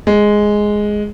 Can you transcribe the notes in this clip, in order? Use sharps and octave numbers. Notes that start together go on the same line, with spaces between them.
G#3